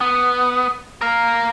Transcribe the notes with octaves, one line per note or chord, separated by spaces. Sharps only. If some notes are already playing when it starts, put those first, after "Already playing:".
B3
A#4 F5